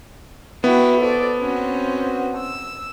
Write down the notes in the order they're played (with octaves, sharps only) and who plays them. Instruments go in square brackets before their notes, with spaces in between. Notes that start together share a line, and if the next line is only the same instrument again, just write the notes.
[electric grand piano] B3 [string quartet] E4 F#4 G5
[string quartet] A4 C5 D5
C4 C#4 F#4
E6